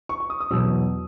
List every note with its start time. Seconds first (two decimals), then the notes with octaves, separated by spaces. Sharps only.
0.09 C#6
0.20 C#6
0.30 D#6
0.40 D#6
0.51 E2 B2 F#3 E6